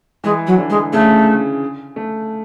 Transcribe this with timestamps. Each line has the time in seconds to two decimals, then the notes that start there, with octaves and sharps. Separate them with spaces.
0.24 E3 G#3
0.47 F#3
0.58 D3
0.70 G#3
0.93 C#3 A3
1.96 A3